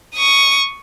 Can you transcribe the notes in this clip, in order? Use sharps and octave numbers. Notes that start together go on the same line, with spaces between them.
C#6 D#6